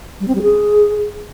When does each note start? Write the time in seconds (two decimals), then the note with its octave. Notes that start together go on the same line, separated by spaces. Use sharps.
0.20 G3
0.28 C4
0.35 G3
0.42 G#4